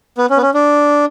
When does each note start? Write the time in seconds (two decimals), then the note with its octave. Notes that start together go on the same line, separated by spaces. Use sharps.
0.18 B3
0.30 C#4
0.37 B3
0.42 C#4
0.54 D4